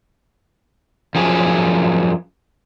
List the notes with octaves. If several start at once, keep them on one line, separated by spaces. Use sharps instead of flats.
F#2 F3 G#4